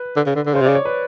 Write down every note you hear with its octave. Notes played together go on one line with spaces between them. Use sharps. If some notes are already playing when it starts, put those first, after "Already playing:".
Already playing: B4
D3
C#3
D3
D3
C#3 C5
C3
D5
C#3
C#5
B4